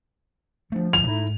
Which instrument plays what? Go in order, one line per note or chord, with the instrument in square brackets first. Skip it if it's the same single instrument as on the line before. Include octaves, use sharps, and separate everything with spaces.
[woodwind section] F3 [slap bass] A3 D4
[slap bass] D1 [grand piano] F7
[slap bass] G#2 [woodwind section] A3 D#4 E4